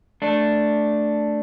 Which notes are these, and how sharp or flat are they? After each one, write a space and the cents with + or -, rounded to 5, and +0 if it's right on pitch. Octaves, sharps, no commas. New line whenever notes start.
A3 +0 D4 +0